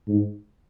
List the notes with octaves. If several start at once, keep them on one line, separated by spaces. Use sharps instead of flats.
G#2